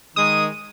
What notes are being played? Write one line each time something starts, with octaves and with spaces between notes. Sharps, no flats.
D#3 G#3 D#6